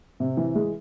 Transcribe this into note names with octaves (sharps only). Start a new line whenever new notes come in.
C3
E3
G#3